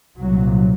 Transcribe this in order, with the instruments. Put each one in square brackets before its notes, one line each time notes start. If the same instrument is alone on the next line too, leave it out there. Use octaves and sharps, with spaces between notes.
[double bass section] C2 A#2 F#3